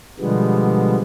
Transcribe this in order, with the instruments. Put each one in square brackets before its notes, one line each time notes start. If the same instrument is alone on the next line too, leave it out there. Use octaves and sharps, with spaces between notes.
[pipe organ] B2 D3 F3 G3 G#3 B3